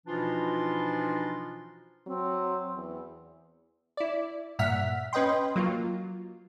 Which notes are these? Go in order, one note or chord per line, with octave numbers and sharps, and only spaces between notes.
B2 E3 F3 D4 D#4 F4
F#3 C4
E2
E4 D5
G2 A#2 E5 F#5 F6 B6
C#4 B4 D#5 G5 C6
F#3 A#3 F4